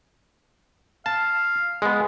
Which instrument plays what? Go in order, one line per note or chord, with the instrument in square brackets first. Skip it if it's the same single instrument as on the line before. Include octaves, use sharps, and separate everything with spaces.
[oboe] F5 [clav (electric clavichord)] A5
[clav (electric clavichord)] G#3 B3